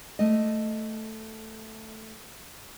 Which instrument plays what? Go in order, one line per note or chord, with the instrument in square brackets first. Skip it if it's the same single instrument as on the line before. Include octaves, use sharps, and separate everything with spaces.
[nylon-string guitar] A3 D#5